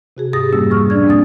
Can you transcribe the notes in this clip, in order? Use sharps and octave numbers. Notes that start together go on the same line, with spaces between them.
C3 F#4 G#4
G#2 G4 G#4 D#6 A6 A#6
F2 B2 G3 A#3 C#4 E6
F3 C#6 F6
D4 D5 G#6
E2 A#3 C4 D#6 A6